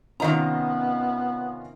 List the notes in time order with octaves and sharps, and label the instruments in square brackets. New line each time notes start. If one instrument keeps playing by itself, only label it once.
[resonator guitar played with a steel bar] C3 D#3 A#5 [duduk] B3 [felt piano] C#4 F4 D#5